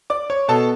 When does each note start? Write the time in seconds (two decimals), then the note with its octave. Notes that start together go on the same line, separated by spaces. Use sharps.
0.10 D5 D6
0.30 C#5 C#6
0.48 B2 A4 A5